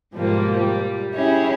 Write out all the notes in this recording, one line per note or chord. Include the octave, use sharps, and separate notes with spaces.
G#2 B2 F3 G3 A#3
G3
C#4 E4 G4 G#4 C#5